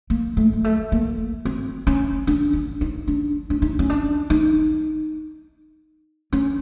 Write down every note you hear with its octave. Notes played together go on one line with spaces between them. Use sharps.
A#3
A3
G#3
A3
A#3
C4
C#4
D4
D4
D#4
D4
D4
D#4
C#4
D4
D#4
C#4